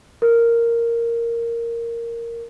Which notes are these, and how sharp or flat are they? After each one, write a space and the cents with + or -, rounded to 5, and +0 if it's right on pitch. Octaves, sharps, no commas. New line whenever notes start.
A#4 -5